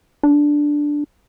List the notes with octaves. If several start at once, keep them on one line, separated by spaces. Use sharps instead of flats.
D4